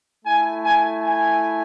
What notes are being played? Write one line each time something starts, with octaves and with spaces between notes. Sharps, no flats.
A3 E4 G#5
G#5
G#5